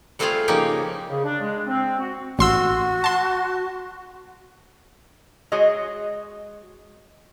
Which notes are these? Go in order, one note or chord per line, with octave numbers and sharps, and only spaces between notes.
G3 A3 C4 F4 G#4 F5
C#3 F3 A#3 D#4 G4
C#3
D4
G#3
C4
F#4
A1 F#4 C6 E6
A5 C6
G#3 F#4 G#4 C#5 D#5